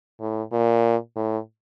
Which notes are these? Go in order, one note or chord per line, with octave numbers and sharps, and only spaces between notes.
A2
A#2
A2